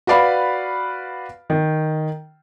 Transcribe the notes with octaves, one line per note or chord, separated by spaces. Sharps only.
F#4 B4 D5 F5 B5
D#3